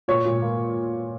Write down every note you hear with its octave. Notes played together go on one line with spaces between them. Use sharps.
A#2 C#5
A#2
A#3